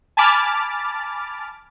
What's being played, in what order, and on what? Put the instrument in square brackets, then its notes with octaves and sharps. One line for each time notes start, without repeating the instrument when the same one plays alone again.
[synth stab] G#5 A5 B5 D6 F6 A6